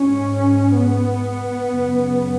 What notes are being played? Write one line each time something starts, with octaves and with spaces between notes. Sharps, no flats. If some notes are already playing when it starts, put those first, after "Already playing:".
Already playing: G#2 C#4
B3
F#2 C#3